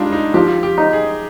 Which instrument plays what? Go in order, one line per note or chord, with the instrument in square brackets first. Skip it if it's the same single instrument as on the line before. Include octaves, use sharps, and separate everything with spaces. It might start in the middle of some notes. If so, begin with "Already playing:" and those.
Already playing: [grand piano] G3 G#3 D4 D#4 [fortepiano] F4
[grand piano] D#4
[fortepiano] F3 [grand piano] G4
[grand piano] G4
[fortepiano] D#4
[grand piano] G#4